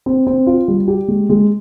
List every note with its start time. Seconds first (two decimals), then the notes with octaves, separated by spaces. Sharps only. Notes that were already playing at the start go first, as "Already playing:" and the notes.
0.06 C4
0.27 C4
0.47 F4
0.68 G3
0.88 G4
1.08 G#3
1.29 G#3